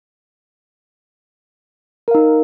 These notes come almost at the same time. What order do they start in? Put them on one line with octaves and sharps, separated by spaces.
A#4 F5 D#4